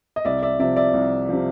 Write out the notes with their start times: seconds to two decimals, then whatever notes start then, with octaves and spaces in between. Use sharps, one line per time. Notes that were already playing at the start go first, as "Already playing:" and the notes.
0.16 D#5
0.25 C2 D5 E5
0.43 D5 E5
0.59 C3 F3 D5 E5
0.76 D5 E5
0.94 C2
1.29 C3 F3